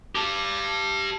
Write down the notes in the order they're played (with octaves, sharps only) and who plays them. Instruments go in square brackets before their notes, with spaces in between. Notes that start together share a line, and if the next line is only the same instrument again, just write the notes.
[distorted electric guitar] G4 A5